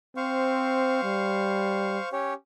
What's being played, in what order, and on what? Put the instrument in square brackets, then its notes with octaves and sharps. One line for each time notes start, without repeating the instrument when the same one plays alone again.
[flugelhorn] C4 [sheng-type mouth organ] C5 F5 C#6
[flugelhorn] G3
[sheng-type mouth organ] C#4 G4 C#5